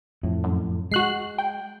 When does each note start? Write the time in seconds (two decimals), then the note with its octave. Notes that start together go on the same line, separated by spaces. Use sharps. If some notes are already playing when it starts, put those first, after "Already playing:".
0.23 F2 A2
0.44 F#2
0.92 G#3 F#4 F#6 C7
1.38 G5